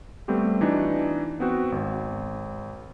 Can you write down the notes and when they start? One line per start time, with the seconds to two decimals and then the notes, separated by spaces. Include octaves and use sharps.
0.28 G3 A3 B3 C4 G4
0.61 E3 D4 D#4 F#4
1.40 B3 C4 F#4
1.72 G#1